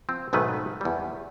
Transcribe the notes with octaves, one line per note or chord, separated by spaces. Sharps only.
F3 C4
B1 G#2 D#3 A3 B4
E2 G3